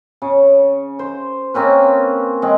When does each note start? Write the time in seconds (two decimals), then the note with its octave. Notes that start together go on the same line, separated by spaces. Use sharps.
0.22 C#3
0.99 C5
1.54 A#3 C4 C#4 B4
2.42 G#3 C4